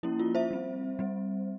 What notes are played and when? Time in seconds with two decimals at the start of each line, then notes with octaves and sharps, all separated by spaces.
0.03 F3 A#3 C#4 E4
0.19 F4
0.35 C5 E5
0.51 G3 C4
0.99 G3 C4